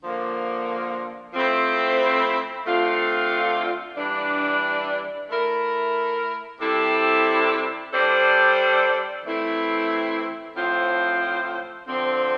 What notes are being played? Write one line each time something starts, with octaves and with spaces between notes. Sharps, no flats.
D3 F3 A#3
F3 A3 C4 E4
D3 A3 C4 F4
E3 G3 D4
A3 E4 A#4
C3 G3 C4 E4 A4
G3 D4 A4 C5
E3 A3 C4 E4
A2 F3 C4 F4 C5
D3 F3 C4